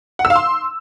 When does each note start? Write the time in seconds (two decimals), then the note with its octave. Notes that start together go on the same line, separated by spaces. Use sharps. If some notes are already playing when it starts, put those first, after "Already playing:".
0.19 F#5
0.25 E6
0.30 F5
0.36 C6